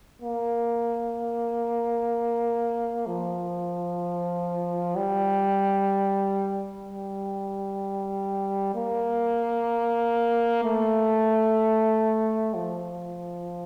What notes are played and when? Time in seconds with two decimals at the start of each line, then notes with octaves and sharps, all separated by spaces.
0.22 A#3
3.06 F3
4.96 G3
6.85 G3
8.75 A#3
10.64 A3
12.54 F3